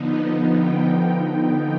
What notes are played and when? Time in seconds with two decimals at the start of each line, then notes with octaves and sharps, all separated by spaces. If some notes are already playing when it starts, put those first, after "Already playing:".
Already playing: D3 F3 B3 D#4
0.51 G5